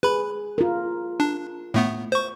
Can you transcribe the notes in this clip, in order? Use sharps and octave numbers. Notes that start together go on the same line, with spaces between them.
G#4 B4 B5
F4 A#4
D4
A2 A3 B3
C5 C#6